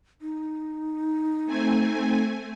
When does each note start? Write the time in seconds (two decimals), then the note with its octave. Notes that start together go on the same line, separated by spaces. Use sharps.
0.22 D#4
1.46 A3 C4 G#5